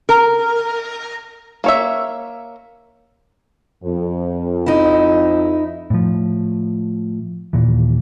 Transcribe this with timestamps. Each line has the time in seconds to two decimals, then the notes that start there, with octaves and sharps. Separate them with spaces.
0.09 A#4
1.64 A#3 C#5 E5
3.84 F2
4.66 D#4 E4
5.90 A2 F3
7.53 D#2 A#2 E3